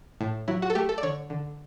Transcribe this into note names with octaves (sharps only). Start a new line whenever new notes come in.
A2
F#3 E4
F#4
A4
A3 G4
A4
D5
D3 C#5
D3